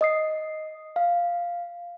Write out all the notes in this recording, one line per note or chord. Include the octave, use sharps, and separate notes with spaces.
D#5 D#6 C7
F5